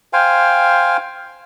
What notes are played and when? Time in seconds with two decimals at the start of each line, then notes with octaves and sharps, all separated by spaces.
0.13 C5 F5 G5 G#5